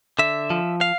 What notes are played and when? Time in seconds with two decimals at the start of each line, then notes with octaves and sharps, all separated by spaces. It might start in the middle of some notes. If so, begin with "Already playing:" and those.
0.19 D3 E5
0.50 F3
0.81 F5